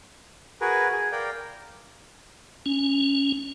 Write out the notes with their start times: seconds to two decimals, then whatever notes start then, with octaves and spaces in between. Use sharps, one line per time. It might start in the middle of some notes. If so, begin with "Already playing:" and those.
0.61 F#4 G#4 A#4 B4
0.92 G#4
1.12 A#4 D5 F5 G5
2.66 C#4